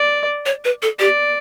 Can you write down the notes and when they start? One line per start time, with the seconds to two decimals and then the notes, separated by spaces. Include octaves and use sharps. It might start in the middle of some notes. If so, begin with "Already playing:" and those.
Already playing: D5
0.46 C#5
0.65 B4
0.82 A4
0.99 G4 D5